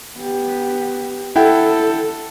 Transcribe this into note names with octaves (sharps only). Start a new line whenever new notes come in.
B3 G4
E4 A4 F#5 G5